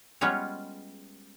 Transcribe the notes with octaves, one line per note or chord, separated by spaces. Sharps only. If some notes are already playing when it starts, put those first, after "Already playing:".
G3 G#3 B3 C#4 F4 C#5